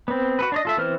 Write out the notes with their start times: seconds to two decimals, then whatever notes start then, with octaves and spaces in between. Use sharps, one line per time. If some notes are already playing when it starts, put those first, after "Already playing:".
0.08 B3 C4
0.39 F#4 A4 B4
0.52 D4 C#5 D#5
0.65 F4 A4 E5
0.77 E3 B3 C4 C5 F6